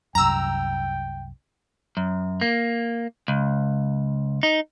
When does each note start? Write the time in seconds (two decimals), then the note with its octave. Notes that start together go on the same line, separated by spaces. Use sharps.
0.15 C2 F#2 G5 A#5 E6
1.97 F#2
2.41 A#3
3.28 C#2
4.43 D#4